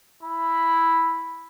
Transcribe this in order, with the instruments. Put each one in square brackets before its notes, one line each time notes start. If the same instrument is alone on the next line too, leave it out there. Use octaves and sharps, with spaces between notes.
[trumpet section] E4 B5